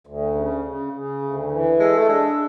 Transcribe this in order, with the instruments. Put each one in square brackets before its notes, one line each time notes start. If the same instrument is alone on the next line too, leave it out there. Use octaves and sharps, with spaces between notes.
[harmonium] D2
C#3
C#3
C#3
D2
E3
[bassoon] G#3 [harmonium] A4
[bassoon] A3
[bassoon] G#3 [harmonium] D4